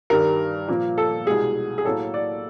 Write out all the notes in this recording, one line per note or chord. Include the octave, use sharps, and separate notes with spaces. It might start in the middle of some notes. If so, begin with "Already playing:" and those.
G2 D#3 G3 A#4
A#2 F3 A#3
A4
C2 B2 G#3 G#4
G#4
A2 F#3 A#3 A4
D5